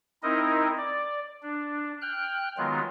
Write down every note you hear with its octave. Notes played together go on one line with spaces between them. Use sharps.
C4 D#4 E4 A#4 D#5
D5
D4
G5 F6 F#6
D#3 F#3 G#3 B3 F4